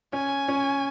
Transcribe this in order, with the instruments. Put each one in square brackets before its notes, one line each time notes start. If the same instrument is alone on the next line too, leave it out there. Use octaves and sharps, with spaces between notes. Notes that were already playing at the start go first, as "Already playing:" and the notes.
[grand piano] C#4 [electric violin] G#5
[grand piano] C#4